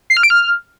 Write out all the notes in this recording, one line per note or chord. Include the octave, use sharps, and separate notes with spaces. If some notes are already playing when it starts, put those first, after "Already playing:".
C7
F6
D7
F6